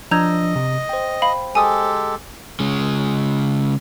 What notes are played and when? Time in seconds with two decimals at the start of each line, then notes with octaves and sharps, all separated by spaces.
0.11 F3 D4 D#5 A#5 E6 G6 G#6
0.56 C3
0.89 C5 G5
1.22 F5 B5
1.55 G#3 G4 A4 G#5 D#6 E6
2.60 C#3 G#3